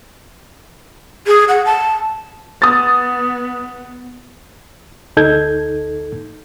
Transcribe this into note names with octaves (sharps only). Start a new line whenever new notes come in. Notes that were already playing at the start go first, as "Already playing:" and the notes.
G#4
F#5
A5
B3 D#6 A6
D2 D#4 A4 G6 G#6